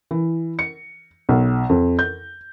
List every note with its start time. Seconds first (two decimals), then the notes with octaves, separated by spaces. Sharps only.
0.11 E3
0.59 C#7
1.29 B1
1.69 F2
1.99 G6